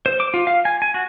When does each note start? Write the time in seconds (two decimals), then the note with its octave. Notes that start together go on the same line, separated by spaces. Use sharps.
0.06 C5
0.20 D6
0.34 F4
0.47 F5
0.65 G#5
0.82 G#5
0.94 F#4